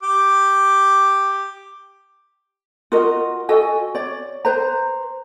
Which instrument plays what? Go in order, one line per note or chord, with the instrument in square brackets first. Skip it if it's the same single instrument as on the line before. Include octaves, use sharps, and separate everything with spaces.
[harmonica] G4 D6
[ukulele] F4 F#4 A#4 D#5
F#4 A4 D#5 G#5
C#5 D5
B4 C5 A#5